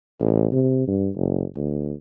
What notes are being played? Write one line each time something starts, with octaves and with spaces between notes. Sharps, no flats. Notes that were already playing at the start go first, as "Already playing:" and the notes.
A1
C3
G2
F#1
D2